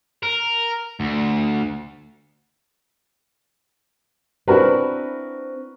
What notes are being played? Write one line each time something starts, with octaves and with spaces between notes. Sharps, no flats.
A#4
D2
C4 D4 E4 F#4 A#4 B4